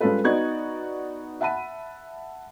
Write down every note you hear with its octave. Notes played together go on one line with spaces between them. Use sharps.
G3 G#3 C#4 F4 A4 B4
B3 D#4 F#4 D5 G#6
E5 F#5 A5 B5 D#7